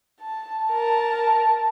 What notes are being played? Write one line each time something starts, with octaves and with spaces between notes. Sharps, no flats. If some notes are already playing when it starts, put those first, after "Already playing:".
A5
A#4 A5